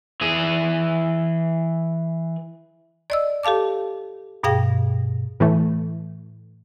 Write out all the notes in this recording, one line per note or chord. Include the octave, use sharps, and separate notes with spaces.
E3 G#4
D5 D#5 E6
G4 A4 F5 A5 D6
G2 B2 G#4 F5 G5 A#6
A2 E3 A3